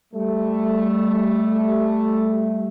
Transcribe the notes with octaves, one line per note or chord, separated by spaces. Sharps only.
G3 A3